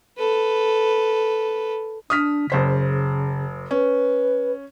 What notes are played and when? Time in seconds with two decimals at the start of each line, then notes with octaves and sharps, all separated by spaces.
0.18 A4 B4
2.10 D4 D#6 F6 B6
2.50 F#1 C#3 C5 B6
3.71 C#4 B4